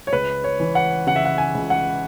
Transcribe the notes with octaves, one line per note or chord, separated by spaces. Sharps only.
C#5
C#2 B4
C#5
E3
F#5
C#3 F#5
E5
F#5
G#5
C#2
F#5